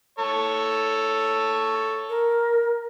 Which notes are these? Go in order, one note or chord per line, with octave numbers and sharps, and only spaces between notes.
A4 C#5
A#4